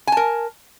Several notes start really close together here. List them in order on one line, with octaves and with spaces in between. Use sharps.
G#5 A5 A#4